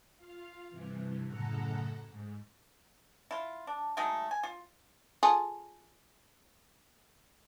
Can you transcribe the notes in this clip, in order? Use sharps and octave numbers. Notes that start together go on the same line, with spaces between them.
F4 F5
G2 C3 E3
F#2 A2 C#3 A4 F#5 A#5
G#2
E4 F4
D4
F#3 G#3 A3 D#4
G#5
F4
F4 G#4 A4